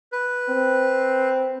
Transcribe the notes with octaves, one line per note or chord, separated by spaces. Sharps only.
B4
C4